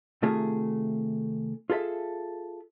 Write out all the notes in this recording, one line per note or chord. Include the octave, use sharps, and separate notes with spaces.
C3 D#3 A3 F4 G#4
F4 G#4 A4 E5